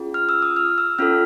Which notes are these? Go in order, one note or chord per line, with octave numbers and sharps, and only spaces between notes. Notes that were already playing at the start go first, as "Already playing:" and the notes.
Already playing: C#4 F4 G#4
F6
E6
D#6
F6
E6
C#4 F4 A4 F6